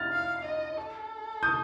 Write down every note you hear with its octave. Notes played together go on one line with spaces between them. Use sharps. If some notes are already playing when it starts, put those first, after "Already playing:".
Already playing: F6 A6
F5
D#5
A4
D#6 G6